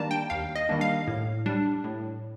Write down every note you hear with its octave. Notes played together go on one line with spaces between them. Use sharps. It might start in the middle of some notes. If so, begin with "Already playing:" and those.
Already playing: D#3 G3 A#3 D4 A5 A#5
G5
D#2 F5
D#5
D#3 G3 A#3 D4
F5
A2
G3 D4
A2